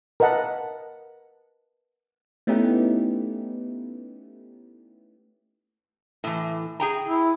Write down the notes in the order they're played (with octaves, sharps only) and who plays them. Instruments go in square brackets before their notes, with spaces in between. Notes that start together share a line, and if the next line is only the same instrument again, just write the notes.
[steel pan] A#4 B4 D#5 F#5 A5
[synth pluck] A3 B3 C#4 D#4 E4 G4
[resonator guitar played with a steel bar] A2 E3
G#4 G5 A#5
[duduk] E4